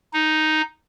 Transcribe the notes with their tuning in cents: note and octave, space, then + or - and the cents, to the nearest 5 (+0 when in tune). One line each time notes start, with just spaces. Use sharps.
D#4 +0